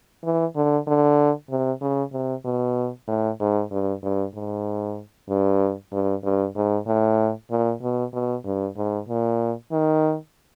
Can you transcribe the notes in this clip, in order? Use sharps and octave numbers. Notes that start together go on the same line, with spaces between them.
E3
D3
D3
C3
C#3
C3
B2
A2
G#2
G2
G2
G#2
G2
G2
G2
G#2
A2
A#2
B2
B2
G2
G#2
A#2
D#3